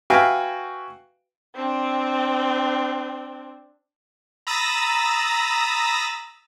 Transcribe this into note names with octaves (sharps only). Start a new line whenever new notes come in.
F#4 B4 E5 F5 G5 G#5
C4 D4
A#5 B5 D#6 E6 A6 A#6